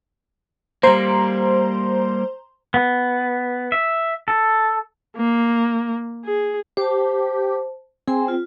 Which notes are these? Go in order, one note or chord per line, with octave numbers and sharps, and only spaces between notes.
G3 A#3 C5 A#5 C6
B3
E5
A4
A#3
G#4
G4 C5 A5
C4 G#4 G#5 C6
F4